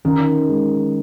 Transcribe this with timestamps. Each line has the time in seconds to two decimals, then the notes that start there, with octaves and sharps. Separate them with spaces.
0.05 D#3 C#4
0.49 G#3